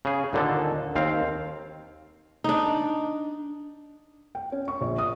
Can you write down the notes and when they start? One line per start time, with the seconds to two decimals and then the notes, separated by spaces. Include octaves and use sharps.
0.05 C#3 G#4
0.33 D#2 A#2 D3 D#4 A4
0.95 D#2 C4 F5
2.44 D4 D#4
4.35 G5
4.52 C#4
4.68 C#6
4.81 A#1
4.98 D#6